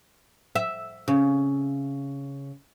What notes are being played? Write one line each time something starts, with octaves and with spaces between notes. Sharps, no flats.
E5
C#3